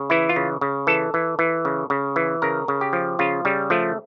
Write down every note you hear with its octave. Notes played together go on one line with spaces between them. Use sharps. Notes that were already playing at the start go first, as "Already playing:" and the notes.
Already playing: C#3
E3 E4
F4
C#3
C#3
E3 A4
E3
E3
C#3
C#3
E3
C#3 A#4
C#3
G4
F3
C#3 F4
C#3 G3
F3 A3